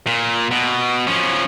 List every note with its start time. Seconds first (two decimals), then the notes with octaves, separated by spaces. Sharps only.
0.07 A#2
0.51 B2
1.07 F3 C#4